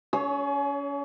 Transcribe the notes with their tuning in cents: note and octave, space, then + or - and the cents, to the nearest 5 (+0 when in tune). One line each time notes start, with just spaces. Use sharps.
C#4 +35 G#4 +30 C#5 +0